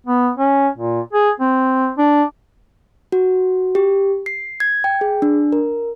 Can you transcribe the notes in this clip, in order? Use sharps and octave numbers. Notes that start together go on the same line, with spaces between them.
B3
C#4
A#2
G#4
C4
D4
F#4
G4
C7
G#6
G5
G#4
D4
A#4